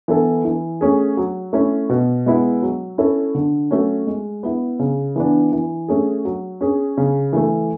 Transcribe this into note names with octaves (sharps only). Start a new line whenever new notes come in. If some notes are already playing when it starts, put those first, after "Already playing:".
E3 B3 E4 A4
E3
A3 C#4 G#4
F#3
A3 C#4 E4
B2
G#3 B3 E4
F#3
C#4 E4 A4
D3
F#3 A3 C#4
G#3
B3 E4
C#3
E3 B3 D4
E3
A3 C#4 G#4
F#3
C#4 G#4
C#3
E3 A3